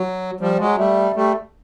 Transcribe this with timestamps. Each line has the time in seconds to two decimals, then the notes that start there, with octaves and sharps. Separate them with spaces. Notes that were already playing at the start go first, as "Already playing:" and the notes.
Already playing: F#3
0.40 F3 G3
0.59 F#3 G#3
0.78 G3 A3
1.16 G3 A3